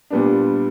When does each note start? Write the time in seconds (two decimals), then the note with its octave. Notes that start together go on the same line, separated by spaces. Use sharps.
0.10 A#2 G3 B3 D4